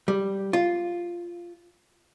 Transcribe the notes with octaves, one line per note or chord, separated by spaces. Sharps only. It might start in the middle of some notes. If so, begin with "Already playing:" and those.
G3
F4